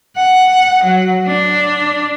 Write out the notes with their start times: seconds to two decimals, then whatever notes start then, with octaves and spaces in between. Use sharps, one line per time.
0.16 F#5
0.84 F#3
1.26 D4